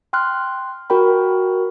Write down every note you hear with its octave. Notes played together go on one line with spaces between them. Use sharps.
G5 C6 F6 F#6
F#4 A#4 G5 B5